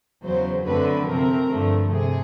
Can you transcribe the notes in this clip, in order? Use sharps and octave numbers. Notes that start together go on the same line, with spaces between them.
E2 C#3 F#3 C5
F#2 D3 F#3 A3 C4 B4
C3 F3 A3 C4 A#4
G2 D3 F3 A3
C3 G#4